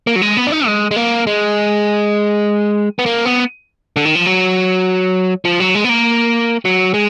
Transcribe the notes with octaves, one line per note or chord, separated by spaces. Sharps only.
A#3
F#3
G#3
B3
D4
D#4
G#3
G#3
A#3
G#3
B3
A#3
B3
D3
D#3
F3
F#3
F3
F#3
G#3
B3
A#3
F#3
G#3